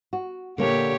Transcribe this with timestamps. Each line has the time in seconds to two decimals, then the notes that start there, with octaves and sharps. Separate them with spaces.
0.13 F#4
0.58 A#2 D3 A#3 D4 G4 C#5